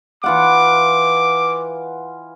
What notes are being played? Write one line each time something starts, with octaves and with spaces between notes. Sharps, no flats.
E3 F4 F#5 D6